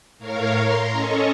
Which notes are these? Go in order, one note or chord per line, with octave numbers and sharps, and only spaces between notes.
A2 A#4 C#5 F5
A#5 C6
C#4 A4 D#5 C#6